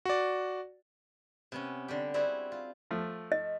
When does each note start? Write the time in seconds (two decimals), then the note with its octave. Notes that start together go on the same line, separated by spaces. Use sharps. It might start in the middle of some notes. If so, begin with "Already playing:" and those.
0.05 F#4 D5
1.52 C3 B3 C#4
1.88 D3 G3 G4
2.14 G3 C4 E4 F#4 G#4
2.52 F4
2.91 F3 A3
3.32 D#5